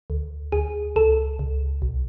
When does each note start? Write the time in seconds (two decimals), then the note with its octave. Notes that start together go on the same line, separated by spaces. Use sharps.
0.10 D2
0.52 D2 G#4
0.96 C#2 A4
1.39 C#2
1.82 B1